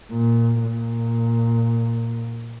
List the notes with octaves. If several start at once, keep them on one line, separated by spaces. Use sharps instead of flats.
A#2
A#2